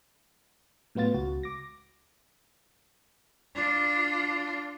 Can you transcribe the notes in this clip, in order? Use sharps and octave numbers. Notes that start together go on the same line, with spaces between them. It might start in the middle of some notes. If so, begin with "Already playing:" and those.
A2 F#3 B3 F4 A6
C#2 F#4
D6 A#6
D4 F4